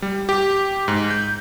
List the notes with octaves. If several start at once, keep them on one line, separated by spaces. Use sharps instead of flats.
G3
G4
G#2
G6